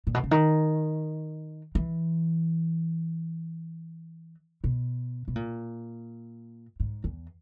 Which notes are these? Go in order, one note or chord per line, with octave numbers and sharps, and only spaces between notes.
A#2
B2
C#3
D#3
E3
B2
B2
A#2
G#2
E2